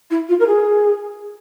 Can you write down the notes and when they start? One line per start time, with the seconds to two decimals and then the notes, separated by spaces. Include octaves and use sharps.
0.10 E4
0.28 F4
0.39 A#4
0.46 G#4